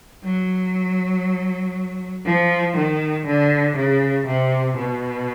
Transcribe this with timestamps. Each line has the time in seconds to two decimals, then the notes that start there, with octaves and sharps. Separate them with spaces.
0.25 F#3
2.26 F3
2.77 D#3
3.27 D3
3.77 C#3
4.27 C3
4.78 B2